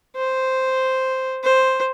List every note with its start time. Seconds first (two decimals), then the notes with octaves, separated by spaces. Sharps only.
0.16 C5
1.44 C5